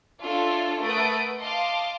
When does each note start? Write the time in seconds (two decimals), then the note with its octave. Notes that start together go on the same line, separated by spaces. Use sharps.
0.23 D4 F4 A4 C#5 E5
0.83 A3 A#4 B4 F#5 D#6 D7
1.39 D#5 F5 A5 C6 D6